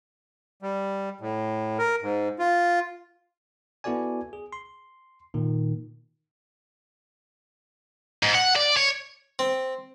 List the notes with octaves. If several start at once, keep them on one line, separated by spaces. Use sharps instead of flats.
G3
A2
A#4
G#2
F4
B3 E4 F#4 A4 D5 G#5
G#4
C6
A#2 D#3
G#2
F#5
D5
C#5
C4